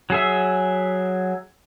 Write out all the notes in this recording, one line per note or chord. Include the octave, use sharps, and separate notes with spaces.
F#3 G#4 E5